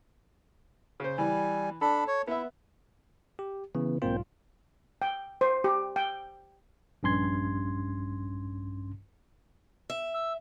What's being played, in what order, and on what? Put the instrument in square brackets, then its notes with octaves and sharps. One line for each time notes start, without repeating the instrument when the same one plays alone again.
[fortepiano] C#3 C5
[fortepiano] E3 [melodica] G3 G#5
[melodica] D4 B5 [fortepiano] A4
[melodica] C#5
[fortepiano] B3 E5 [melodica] E4
[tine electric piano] G4
[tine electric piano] C#3 [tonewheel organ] E3 B3
[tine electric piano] B1 G#2 F4 [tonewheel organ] A#3 C4 G5
[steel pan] G5
C5
G4
G5
[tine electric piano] A#1 G2 C#4 C6 G#6
[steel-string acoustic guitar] E5
[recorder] E6